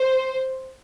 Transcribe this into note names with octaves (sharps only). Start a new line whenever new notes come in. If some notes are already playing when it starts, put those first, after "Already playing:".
Already playing: C5